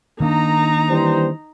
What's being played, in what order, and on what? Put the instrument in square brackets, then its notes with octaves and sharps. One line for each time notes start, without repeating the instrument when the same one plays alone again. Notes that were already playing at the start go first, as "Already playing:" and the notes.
[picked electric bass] D#3 A#3 D4 [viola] D#4 A#5
[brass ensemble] E3 G3 C5